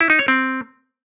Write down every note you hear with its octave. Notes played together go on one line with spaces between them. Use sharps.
E4
D#4
C#5
C4